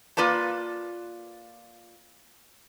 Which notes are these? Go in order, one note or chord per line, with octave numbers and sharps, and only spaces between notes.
A#3 F4 B4 D5 A5